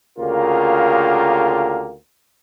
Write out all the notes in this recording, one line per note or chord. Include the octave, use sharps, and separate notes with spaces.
D2 C#3 A#3 F4 G4 A#4